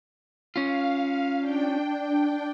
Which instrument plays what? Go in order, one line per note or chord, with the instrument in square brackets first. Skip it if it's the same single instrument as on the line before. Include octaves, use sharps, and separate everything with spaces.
[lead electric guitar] C#4 F4 [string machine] F5
[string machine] D4 G5